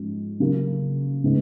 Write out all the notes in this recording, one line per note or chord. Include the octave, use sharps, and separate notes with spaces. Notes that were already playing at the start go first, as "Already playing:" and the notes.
Already playing: G#2 F3 G#3 C#4
C#3 F#3 A#3
C#3 G#3 B3